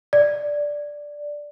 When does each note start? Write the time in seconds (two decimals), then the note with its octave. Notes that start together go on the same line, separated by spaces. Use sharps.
0.13 D5